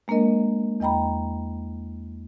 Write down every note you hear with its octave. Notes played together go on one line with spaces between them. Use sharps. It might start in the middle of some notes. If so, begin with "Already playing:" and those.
G#3 A#3 D4 A#4 D#5
E2 D#5 G5 A#5 B5